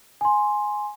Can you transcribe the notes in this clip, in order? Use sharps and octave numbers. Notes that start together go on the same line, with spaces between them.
G#5 C6